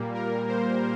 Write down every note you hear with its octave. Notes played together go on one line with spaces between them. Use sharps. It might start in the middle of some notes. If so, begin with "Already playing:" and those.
Already playing: A#2 G3 A#3
A#4
C5